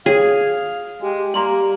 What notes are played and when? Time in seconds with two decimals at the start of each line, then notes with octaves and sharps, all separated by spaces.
0.06 G#4 C#5 F5
1.02 G#3 G4
1.34 G3 A#3 A#5 C6 F#7